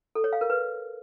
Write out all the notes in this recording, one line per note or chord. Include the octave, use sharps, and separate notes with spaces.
A4
C#5
F5
A#4
B4